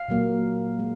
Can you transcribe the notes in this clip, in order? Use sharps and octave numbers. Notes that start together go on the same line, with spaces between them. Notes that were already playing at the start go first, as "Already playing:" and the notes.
Already playing: F5
A#2 F#3 A#3
G#3